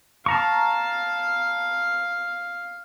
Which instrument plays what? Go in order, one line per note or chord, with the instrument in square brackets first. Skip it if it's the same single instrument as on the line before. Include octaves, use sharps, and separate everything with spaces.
[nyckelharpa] F5 [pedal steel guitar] A5 A#5 C#6